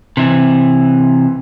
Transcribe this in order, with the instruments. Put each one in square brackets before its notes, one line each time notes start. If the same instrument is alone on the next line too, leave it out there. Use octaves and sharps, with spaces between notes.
[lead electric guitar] C3 E3